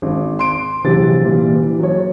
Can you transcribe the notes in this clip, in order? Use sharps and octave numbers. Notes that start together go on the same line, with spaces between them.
G#1
C6 D7
A#1 C3 E3 F#3 A6
A#2 E3 G3
E3
F#3 C#5